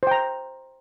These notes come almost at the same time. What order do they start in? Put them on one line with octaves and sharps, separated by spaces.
C5 G5 A#5